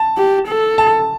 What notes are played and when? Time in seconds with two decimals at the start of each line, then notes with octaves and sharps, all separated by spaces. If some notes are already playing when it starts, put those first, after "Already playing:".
Already playing: A5
0.17 G4
0.47 A4
0.78 A5